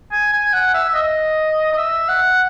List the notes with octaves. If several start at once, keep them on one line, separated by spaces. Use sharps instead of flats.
G#5
G#5
F#5
E5
E5
D#5
D#5
E5
F#5